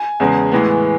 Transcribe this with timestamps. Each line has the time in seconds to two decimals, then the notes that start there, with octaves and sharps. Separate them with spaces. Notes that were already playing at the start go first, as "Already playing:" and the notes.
Already playing: G#5
0.20 E2 C#3 G#3 B3
0.52 A2 E3 G#3 B3